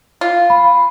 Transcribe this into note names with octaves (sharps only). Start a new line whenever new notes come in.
F4
B5